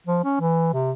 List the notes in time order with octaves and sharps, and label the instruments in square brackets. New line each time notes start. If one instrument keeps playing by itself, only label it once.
[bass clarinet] F3
C#4
E3
C3